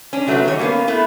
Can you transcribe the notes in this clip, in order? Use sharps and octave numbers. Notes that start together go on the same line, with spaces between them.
C#4 D4
C3 F#3 A3 C#4 F#4 B4
D#3 G3 D#4 C#5
G#3 A#3 B3 C#4 F5
A3 B3 E4 B4